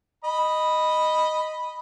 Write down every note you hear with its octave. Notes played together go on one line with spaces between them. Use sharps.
D#5 B5